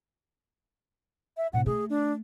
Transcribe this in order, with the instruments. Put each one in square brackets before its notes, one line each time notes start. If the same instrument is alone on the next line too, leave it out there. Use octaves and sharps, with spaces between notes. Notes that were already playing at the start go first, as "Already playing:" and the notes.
[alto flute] E5
[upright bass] A2 C3 [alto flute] F#5
[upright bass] A3 [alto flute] G#4
[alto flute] D4